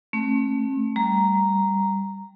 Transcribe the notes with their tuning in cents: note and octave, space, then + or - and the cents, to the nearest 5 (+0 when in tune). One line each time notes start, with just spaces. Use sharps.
A3 +0 C#4 -40
G3 +0 A#5 +0